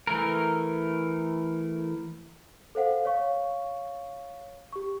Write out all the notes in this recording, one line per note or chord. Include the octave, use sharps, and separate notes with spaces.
E3 A3 A#4
A4 C5 F5 F#5
C#5 F5 C#6
G4 C#6